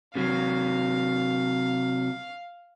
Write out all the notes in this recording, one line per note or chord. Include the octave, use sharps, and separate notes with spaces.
C3 F#3 F5